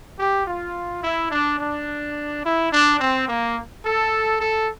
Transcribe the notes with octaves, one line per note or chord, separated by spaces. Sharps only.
G4
F4
E4
D4
D4
E4
D4
C4
A#3
A4
A4